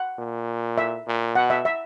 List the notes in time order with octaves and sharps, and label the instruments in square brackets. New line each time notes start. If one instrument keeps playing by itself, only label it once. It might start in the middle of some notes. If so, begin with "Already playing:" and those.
Already playing: [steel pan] F#5
[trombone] A#2
[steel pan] E5
[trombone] A#2
[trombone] B2 [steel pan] F#5
[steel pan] E5
E5